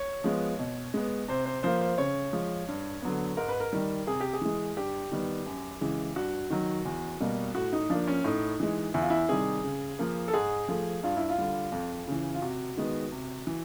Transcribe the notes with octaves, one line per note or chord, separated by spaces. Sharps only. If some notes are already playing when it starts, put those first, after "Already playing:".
Already playing: C#5
F3 G#3 B3
B2
G#3 B3
C3 C5
C5
F3 A#3 C5
C5
C#3 C#5
F3 G#3
G2
D3 F#3 B3
G#2 A#4
B4
A#4
D#3 G3
C3 G#4
G4
G#4
E3 G#3
G2 G4
D#3 G3 B3
F#2
C#3 E3 G#3
G2 F#4
D#3 F#3
E2
B2 G3 A#3
A2 F#4
D#4
F3 A#3 D4
C#4
A2 D#4
E3 G#3
E2 E4
F4
E4
C3 D#3 G3 G#4
C#3
F3 A#3
A4
G#2 G#4
F3 A3
G2 F4
E4
F4
D3 G3
F2
C#3 E3
F4
C3 F#4
D#3 G#3 B3
C3
E3